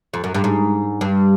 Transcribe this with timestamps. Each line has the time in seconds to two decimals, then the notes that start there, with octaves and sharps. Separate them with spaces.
0.14 F2
0.24 F#2
0.34 G2
0.44 G#2
1.01 G2